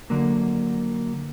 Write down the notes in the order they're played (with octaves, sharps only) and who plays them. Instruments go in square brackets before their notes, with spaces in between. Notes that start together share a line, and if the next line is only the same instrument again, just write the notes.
[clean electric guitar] D3 F#3 A#3